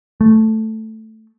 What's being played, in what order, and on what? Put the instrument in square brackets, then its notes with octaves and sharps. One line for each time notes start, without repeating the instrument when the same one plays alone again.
[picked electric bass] A3